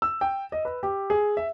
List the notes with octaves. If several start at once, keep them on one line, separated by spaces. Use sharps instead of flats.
E6
G5
D#5
B4
G4
G#4
E5